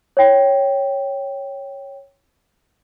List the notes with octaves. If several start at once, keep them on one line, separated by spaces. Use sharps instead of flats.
C#5 G5